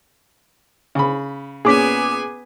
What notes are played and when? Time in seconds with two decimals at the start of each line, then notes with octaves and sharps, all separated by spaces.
0.95 C#3 B5
1.65 A#2 B3 C#4 G#4 G#5 D6 B6